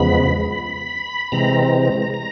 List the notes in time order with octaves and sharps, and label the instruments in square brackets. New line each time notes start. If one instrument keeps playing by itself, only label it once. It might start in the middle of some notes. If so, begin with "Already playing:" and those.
Already playing: [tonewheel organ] E2 C#3 F3 G#3 B3 B5
C3 E3 G#3 C4 A#5
A#5